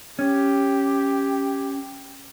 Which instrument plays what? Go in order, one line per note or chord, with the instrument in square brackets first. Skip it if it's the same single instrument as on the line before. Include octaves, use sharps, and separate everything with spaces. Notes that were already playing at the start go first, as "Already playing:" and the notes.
[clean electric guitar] C#4 [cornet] G4